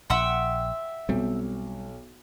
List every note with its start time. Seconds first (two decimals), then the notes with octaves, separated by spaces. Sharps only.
0.10 A#1 E5 F#5 G5 C6
1.09 B1 G3 C4